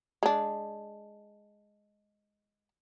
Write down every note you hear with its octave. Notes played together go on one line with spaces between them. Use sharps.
G#3 D4